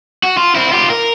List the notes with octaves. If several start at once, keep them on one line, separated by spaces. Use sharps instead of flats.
F#4
F4
C4 E4
F4 G4
A#4